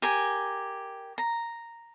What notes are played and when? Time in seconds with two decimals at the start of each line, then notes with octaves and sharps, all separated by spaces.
0.02 G4 A#4 G#5
1.18 A#5